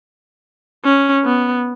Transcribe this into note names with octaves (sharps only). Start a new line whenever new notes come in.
C#4
B3